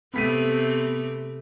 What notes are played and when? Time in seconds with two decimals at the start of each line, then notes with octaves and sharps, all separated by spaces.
0.14 C3 A3 B3 C4 B6 D#7